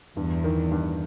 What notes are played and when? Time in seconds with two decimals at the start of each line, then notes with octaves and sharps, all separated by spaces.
0.17 E2 G2
0.44 D#3
0.71 G2